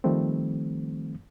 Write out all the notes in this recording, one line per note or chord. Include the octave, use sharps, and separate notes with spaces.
D#3 F3 G3 A3 C4